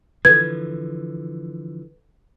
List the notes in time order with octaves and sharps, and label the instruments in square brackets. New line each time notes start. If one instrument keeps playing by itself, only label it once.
[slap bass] D3 E3 F3 [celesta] A4 B4 [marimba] G#6